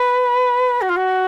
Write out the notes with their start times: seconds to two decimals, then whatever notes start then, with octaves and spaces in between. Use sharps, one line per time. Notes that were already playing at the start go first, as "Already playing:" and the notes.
Already playing: B4
0.81 F#4
0.89 F4
0.96 F#4